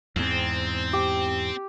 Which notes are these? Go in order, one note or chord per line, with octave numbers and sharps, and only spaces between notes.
E2 G#2 C4
G4